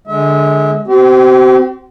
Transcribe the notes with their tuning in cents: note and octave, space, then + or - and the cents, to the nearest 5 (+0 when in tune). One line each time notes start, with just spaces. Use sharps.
D3 +0 G#3 +0 E5 -35
C4 -15 G4 -45